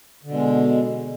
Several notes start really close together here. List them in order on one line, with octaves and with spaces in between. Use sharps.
D3 B2 G#3